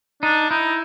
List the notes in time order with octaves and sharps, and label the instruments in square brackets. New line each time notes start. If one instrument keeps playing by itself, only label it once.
[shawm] D4 [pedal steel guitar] D#4
[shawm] D#4 [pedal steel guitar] E4